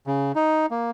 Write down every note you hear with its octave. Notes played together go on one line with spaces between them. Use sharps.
C#3
D#4
A#3